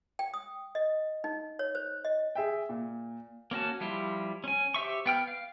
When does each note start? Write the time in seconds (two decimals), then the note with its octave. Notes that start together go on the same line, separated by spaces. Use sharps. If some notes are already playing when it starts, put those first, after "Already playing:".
0.19 G5
0.34 D#6
0.75 D#5
1.24 D#4
1.59 C#5
1.75 C5
2.05 D#5
2.35 G#4 E5 G5
2.69 A#2
3.51 A#3 C#4 F#4 A5
3.81 F3 G3 E4 F4
4.44 C#4 G#5
4.74 G4 C5 E5 C#6
5.06 B3 G5 F6
5.28 F5